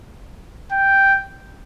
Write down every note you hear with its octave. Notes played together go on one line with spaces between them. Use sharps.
G5